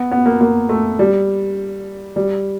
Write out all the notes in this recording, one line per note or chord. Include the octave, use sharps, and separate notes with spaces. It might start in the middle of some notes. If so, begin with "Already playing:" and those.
Already playing: B3
B3
A#3
A#3
A3
G3
G3